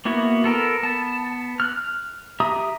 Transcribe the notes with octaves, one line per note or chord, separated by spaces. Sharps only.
A#3 B3 E4 F#4
B3 A4 A#4
B3 A5
F6 F#6
G4 E5 A#5 D#6